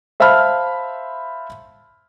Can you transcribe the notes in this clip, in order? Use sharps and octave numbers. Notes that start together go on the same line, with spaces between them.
C5 E5 F5 A5 B5 F6